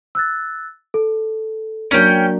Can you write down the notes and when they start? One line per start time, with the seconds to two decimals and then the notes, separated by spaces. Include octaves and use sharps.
0.15 E6 F#6 A6
0.94 A4
1.91 F#3 A#3 C#4 D4 G5